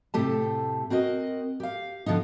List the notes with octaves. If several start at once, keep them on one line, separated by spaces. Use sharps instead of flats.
A2 C3 A3 G4 A4 A5
C4 F#4 A#4 D#5
G4 F5
D3 F3 B3 D#4